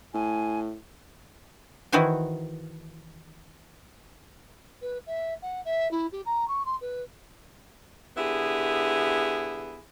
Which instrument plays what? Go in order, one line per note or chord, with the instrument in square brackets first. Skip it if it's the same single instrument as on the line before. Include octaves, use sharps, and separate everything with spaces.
[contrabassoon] A2 [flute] G#5
[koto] D#3 E3 E4 F#4 C5 G#5
[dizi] B4
E5
F#5
E5
E4
G4
A#5
C#6
C6
B4
[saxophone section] D3 B3 E4 G4 G#4